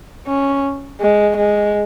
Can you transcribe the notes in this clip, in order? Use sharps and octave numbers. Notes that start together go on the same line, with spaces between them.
C#4
G#3
G#3